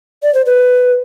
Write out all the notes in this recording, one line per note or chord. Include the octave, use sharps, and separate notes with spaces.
D5
C5
B4